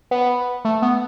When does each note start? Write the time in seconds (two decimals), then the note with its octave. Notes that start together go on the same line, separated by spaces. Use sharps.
0.11 B3
0.65 A3
0.82 B3